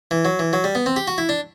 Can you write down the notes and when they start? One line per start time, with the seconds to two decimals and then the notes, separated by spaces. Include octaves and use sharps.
0.11 E3
0.25 F#3
0.39 E3
0.53 F#3
0.64 G3
0.75 B3
0.86 C4
0.96 G4
1.07 F#4
1.18 E4
1.29 D4